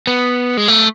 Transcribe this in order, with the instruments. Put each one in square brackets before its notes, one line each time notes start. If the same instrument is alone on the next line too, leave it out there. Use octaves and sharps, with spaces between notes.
[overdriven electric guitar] B3
G#3
A3